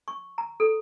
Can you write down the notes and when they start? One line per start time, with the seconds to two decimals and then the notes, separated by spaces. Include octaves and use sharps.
0.08 C#6
0.38 A#5
0.60 A4